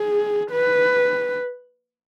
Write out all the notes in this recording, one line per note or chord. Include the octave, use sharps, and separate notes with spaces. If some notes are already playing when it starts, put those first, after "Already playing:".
Already playing: G#4
B4